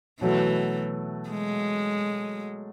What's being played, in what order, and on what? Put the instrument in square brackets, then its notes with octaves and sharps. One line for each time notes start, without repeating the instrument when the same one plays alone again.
[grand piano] B2 F#3 A3 [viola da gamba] E3
[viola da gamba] G#3